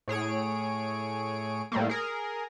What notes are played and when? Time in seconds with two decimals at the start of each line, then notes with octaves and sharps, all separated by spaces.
0.08 A2 G#4 C#5 D7
1.72 A2 G3 A3 A#3
1.89 G#4 A#4